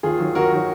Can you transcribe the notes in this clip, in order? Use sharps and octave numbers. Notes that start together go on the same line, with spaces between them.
D#2 F4 G#4
D#3 F#3
D#2 F#4 A#4
D#3 F#3